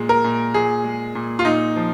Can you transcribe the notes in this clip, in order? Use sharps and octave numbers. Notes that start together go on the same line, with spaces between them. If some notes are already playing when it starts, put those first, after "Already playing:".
Already playing: A#2 G#3
A#4
A#2
A#2 G#4
G#3
A#2
F4
A#2 D#4
F3